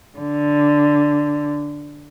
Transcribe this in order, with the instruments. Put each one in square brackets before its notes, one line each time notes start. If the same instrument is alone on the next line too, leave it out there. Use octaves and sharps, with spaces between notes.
[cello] D3